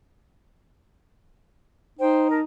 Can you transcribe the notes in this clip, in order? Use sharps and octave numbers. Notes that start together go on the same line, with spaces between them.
D#4 C5 G5
A#4 A5